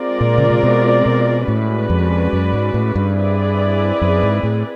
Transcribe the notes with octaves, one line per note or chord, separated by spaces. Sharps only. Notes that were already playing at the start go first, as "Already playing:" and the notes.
Already playing: G#3 C4 F4 A#4 D5
A#2
C#3
C3
B2
B2
A2 G#3 C#4 F#4 B4 D5
F2
F#2
G#2
A2
G2
C4 E4 G#4 B4 D5
F#2
G#2
A2